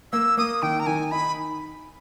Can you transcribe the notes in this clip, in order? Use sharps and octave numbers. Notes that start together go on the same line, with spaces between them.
A#3 E6
A#3 D#6
D#3 G5
A#5
D#3 G#5
D#4 B5